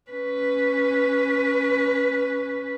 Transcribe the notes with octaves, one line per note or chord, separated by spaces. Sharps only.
C#4 B4